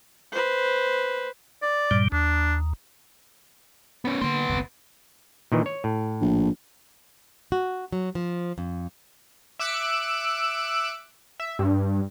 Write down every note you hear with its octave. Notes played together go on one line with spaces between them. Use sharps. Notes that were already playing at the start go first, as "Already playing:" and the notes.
B4 C5
D5
G2 A#2 G3
D#2 D4
B3 C#4
D3 A#3 B3 C6
G1 C2 F2
A#2 D#3 E3
C#5
A2
A#1
F#4
F#3
F3
F2
E5 D6 E6 F#6 C#7 D7
E5
G2